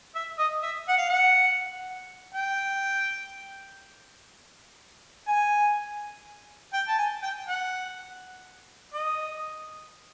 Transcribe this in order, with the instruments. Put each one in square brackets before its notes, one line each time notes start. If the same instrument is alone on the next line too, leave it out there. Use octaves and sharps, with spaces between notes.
[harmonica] E5
D#5
E5
F#5
F5
F#5
G5
G#5
G5
A5
G#5
G5
F#5
D#5